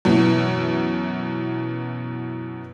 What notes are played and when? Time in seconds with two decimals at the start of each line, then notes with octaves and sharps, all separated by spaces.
0.05 F#2 B2 E3